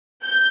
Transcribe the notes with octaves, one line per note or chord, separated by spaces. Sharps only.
G6